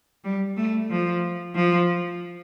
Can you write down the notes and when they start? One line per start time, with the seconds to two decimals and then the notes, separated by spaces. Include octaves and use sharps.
0.24 G3
0.57 A3
0.90 F3
1.55 F3